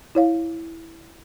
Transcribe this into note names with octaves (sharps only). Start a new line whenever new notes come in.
E4 C#5 F5